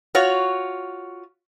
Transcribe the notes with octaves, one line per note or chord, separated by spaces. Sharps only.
F4 F#4 C#5